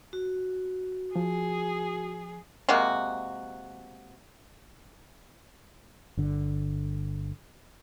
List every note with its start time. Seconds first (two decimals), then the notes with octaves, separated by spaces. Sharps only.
0.13 F#4
1.16 F3 G#4
2.69 C3 G#3 A#3 F#4
6.17 G1 D3